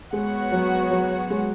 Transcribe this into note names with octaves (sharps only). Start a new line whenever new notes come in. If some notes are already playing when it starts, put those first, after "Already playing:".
G#3 B3 F#4 C#5 F#5
F#3
F#3
G#3